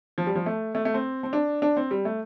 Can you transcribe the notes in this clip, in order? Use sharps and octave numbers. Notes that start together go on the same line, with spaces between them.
F3
G3
F3
A3
A3
A3
C4
C4
D4
D4
C4
G3
A3